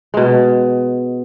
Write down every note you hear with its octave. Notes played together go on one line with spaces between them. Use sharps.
B2 G#3